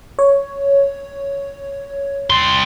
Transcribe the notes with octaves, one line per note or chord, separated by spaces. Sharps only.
C#5
G3 C6